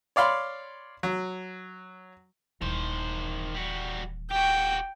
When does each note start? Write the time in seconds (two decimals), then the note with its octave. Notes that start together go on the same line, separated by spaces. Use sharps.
0.16 C#5 D5 F5 B5 C6
1.03 F#3
2.62 D#1 D#3 E3 C5
3.55 G3 F#4
4.31 F#4 G4 G5